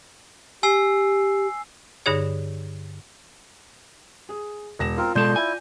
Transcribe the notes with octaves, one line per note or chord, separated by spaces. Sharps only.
G4 G#5 E6 C7
G2 D3 D#4 G#4 C#5
G#4
E1 A#6 E7
C4 F4 A#4
B2 G#3 A4 D5 C6 G6
E4 G#5